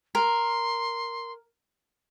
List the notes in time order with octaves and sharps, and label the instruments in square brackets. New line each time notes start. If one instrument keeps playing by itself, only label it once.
[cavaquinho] A#4 [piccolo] C6